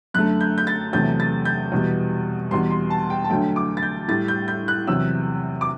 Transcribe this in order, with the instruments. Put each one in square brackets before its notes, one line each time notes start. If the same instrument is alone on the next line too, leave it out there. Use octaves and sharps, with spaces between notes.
[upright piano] F#2 D3 A3 F#6
G6
G6
A6
E2 C3 F#3 A3 G6
A6
G6
E2 B2 G3
E2 B2 G3 C6
C6
A5
G5
A5
D2 D3 F#3 A3 G5
D6
A6
G6
A2 G3 A6
G6
G6
F#6
E2 C3 F#3 E6
D6